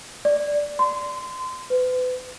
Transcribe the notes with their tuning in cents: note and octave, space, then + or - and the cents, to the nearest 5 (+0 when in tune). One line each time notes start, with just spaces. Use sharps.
D5 -5
C6 -25
B4 +35